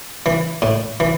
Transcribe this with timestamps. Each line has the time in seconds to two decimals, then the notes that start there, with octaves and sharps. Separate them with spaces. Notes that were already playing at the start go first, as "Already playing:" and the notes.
0.26 E3
0.62 A2
1.00 E3